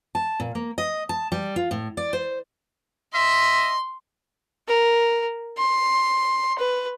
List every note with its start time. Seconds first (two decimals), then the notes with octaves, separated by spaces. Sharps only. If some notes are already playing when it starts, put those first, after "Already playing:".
0.15 A5
0.40 A#2
0.55 A#3
0.78 D#5
1.09 A5
1.32 G3
1.56 F4
1.71 A2
1.97 D5
2.13 C5
3.14 D#5 E5 C6
4.68 A#4
5.58 C6
6.59 B4